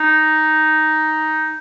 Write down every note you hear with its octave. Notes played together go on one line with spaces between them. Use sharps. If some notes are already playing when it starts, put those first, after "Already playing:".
Already playing: D#4